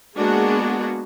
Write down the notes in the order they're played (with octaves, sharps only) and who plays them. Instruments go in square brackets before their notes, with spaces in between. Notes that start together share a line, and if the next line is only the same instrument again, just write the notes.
[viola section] G#3 A#3 B3 D4 F#4 G#4